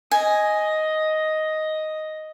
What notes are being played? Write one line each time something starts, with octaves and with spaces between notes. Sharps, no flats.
D#5 G#5